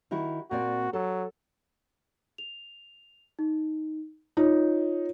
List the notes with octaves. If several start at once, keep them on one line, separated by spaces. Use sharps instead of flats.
D#3 E4 F#4
A#2 C4 F#4 D5
F#3 A4
F7
D#4
D#4 F4 C#5